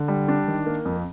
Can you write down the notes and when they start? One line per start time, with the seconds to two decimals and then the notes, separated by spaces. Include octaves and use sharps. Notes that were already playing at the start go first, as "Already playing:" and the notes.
Already playing: D3
0.08 G3
0.28 D4
0.48 D#3
0.66 A#3
0.85 F2